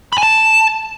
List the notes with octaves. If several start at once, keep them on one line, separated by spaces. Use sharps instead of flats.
B5
G#5
A5